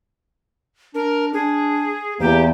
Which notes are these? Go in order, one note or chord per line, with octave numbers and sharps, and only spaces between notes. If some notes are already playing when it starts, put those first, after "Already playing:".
D4 A#4
D4 G#4
E2 A#3 G4